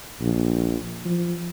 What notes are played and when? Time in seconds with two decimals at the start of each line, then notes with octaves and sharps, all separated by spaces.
0.21 A#1
1.05 F3